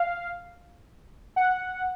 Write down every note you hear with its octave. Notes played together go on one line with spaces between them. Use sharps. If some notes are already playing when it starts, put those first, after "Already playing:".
Already playing: F5
F#5